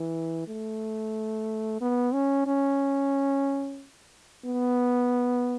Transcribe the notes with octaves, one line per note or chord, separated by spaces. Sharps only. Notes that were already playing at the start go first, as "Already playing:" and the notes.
Already playing: E3
A3
B3
C#4
C#4
B3